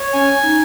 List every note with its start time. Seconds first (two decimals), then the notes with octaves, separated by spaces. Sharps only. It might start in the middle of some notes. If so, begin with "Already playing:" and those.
Already playing: C#5
0.13 C#4 G#5
0.43 D#4